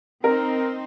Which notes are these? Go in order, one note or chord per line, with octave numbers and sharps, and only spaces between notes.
C4 D#4 A#4